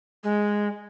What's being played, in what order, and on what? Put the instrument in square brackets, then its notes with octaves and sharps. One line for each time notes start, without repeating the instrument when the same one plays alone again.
[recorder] G#3